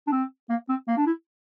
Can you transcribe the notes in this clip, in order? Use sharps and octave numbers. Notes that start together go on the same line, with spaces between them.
D4
C4
A#3
C4
A#3
D4
E4